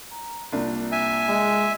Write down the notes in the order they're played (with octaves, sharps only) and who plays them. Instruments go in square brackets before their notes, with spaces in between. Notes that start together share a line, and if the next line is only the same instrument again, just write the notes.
[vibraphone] A#5
[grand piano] C2 D4 [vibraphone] A#3 F4
[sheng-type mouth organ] E5 G#5
[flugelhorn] G#3